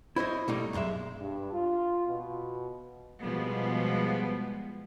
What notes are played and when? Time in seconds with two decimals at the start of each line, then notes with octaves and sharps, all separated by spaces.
0.16 E4 C5 C#5 D#5
0.48 B2 G3 A3 A#3 D#4
0.73 B1 F#2 A2 G#3 E5
1.20 G2
1.52 F4
2.07 B2
3.21 B2 F3 G3 G#3 B3